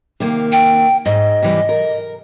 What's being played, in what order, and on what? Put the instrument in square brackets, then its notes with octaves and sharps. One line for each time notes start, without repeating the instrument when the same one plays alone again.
[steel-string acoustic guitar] C3 D#3 A#3
[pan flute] G5
[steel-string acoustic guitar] G#2 [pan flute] D#5
[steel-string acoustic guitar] C3 E3 G3
A#4